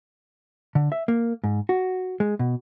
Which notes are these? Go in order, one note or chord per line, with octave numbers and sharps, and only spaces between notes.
D3
E5
A#3
G#2
F#4
G#3
B2